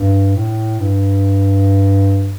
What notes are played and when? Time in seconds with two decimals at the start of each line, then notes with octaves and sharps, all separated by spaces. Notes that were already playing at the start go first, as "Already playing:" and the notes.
Already playing: G2
0.35 A2
0.79 G2